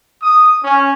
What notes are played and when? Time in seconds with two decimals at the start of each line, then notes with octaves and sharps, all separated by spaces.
0.22 D#6
0.63 C#4